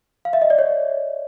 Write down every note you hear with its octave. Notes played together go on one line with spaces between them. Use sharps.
F5
E5
D#5
D5
C#5